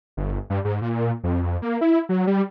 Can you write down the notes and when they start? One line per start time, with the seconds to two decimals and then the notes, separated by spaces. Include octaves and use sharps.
0.17 G1
0.50 G2
0.65 G#2
0.81 A#2
1.24 F2
1.43 F2
1.62 A#3
1.81 E4
2.09 F#3
2.27 G3